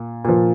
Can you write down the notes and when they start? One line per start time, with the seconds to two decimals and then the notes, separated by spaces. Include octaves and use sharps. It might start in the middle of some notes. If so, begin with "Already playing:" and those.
Already playing: A#2
0.25 A#2 F3